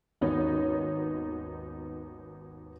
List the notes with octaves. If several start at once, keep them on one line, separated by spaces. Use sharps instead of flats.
G#1 D#2 B3 C#4 D#4 C#5